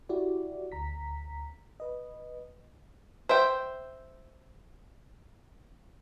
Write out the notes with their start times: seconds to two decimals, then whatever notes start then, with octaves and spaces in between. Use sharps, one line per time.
0.09 E4 F#4 G4 D5
0.72 D2 A#5 B6
1.80 B4 D#5
3.29 C5 E5 G5